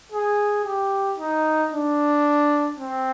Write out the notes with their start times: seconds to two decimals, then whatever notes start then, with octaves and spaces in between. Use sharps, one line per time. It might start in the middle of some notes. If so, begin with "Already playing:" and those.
0.12 G#4
0.65 G4
1.18 D#4
1.72 D4
2.79 C4